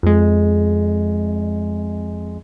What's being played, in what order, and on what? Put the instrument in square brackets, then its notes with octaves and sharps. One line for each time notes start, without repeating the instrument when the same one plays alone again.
[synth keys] F2 G#3